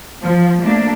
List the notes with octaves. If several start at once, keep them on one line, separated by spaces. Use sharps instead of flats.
F3
A3 A#3 D4